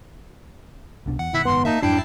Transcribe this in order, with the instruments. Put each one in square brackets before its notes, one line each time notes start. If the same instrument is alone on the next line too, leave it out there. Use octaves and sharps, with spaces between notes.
[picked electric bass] C2 B2 D4
[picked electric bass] E2 [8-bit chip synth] F#5
[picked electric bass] F#1 B2 D#3 [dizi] E4
[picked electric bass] F#1 G#2 D#3 [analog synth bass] B3 [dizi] C6
[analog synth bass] A#3 [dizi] D#4 [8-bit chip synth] E5 A5
[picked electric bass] F2 G#2 F#3 [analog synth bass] D4 [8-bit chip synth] E4 A5 C7 [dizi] G5